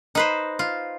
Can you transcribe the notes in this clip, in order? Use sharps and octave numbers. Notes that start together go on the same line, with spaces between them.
D#4 B4 C5
F4